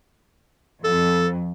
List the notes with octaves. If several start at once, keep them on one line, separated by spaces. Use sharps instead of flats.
F2 A4